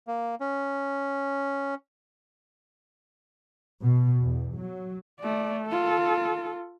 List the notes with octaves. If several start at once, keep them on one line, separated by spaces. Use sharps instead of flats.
A#3
C#4
B2
E2
F#3
A3 D5
F4 A4